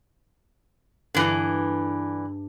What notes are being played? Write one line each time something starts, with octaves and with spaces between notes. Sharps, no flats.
G2 D3 E3 D4 G#4